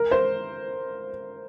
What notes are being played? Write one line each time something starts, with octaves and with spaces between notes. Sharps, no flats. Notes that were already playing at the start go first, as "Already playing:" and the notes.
Already playing: A#4
C5